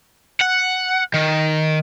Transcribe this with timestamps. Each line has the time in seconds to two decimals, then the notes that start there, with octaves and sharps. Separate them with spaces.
0.41 F#5
1.14 D#3